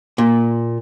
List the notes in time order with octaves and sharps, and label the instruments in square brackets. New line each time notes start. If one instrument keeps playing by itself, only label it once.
[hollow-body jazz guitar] A#2